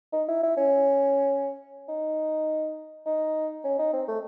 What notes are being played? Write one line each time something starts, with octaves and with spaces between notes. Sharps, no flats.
D#4
E4
E4
C#4
D#4
D#4
C#4
D#4
C4
A3